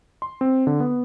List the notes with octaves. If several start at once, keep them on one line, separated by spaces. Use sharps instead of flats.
C6
C4
D3
B3